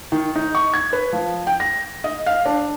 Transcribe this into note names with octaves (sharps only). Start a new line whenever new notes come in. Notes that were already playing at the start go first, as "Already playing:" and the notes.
D#3
D#4
C#6
G#6
B4
F3
G5
A#6
D#5
F5
D4